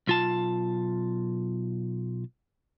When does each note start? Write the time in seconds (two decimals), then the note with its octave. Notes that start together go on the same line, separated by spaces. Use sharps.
0.07 B1 F4 A5